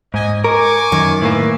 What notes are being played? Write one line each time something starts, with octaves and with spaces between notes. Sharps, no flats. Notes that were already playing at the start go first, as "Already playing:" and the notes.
G#2 D#5 G#5
A#4 G#5 C#6 D6
F#2 D#3
A2 A#3 B4 E5 G#5